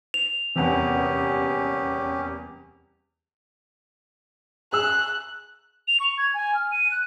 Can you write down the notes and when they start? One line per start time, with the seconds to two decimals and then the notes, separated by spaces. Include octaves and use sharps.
0.14 F7
0.56 D#1 E2 C3 E3 C#4 G4 F#5
4.73 G#4 E6 F#6
5.88 F7
6.00 C#6
6.18 G#6
6.34 G#5
6.55 F6
6.72 D#7
6.91 F#6